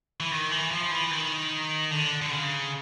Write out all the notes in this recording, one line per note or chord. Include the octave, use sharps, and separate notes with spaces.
E3
D#3
E3
F3
E3
D#3
D3
D3
C#3